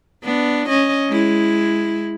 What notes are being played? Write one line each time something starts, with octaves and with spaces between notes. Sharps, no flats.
B3 D4
C#4 D#5
G#3 E4